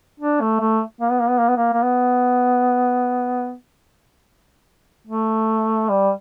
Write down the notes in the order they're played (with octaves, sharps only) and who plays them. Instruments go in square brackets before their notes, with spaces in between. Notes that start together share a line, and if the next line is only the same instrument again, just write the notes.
[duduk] D4
A3
A3
A#3
B3
A#3
B3
A#3
B3
A#3
A#3
B3
A3
G3